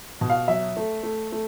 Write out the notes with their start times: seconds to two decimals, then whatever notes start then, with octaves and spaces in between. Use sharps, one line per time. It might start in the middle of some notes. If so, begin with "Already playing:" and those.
0.21 B2
0.30 F5
0.48 F#3 E5
0.77 A3
1.03 A3
1.32 A3